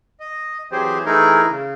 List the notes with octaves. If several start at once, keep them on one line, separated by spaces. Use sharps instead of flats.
D#5
E3 F#3 C4 G4 G#4 C5
E3 A3 D#4 E4 G#4 A#4
C#3